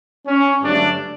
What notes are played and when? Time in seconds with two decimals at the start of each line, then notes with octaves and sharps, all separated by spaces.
0.26 C#4
0.62 G2 D3 F#3 A3 D4